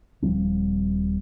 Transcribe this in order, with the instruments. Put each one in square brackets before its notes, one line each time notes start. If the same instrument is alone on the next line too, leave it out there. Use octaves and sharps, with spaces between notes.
[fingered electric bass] D#1 F3 G3 C4